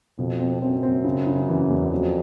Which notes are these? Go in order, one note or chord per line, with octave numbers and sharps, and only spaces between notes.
F2 B2
C4
F#2 C4
C4
C#3
C#3
E3
E2
F2 F#3